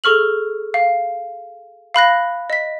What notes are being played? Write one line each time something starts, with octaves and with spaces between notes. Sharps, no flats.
G#4 A4 C#6 F6 F#7
F5
F5 B5 F#6 A#6
D#5 B6